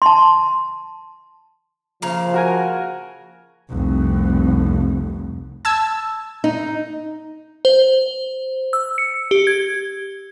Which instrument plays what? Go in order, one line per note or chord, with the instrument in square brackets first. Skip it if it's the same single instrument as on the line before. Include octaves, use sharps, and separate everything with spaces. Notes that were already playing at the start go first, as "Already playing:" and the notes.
[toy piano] A5 C6
[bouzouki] C#3 A#3 F5 [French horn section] F3
[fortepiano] F#4 A#4 G#5
[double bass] F1 C2
[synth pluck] A5 E6 G#6
[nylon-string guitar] D#4
[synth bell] C5
E6
C#7
G4
G#6